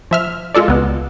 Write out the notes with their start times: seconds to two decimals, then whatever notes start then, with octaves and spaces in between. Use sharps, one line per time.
0.11 F3 E5 F6
0.55 G#3 F4 A4 D5
0.68 C#2 B3